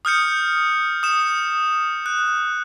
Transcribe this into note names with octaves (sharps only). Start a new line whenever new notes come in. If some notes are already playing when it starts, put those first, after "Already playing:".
D#6 F6 G6 C#7
D#6 E7
F#6